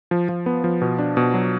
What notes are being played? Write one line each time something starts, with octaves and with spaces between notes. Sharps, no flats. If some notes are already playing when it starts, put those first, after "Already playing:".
F3
F3
B3
F3
B2
D4
B2
F#3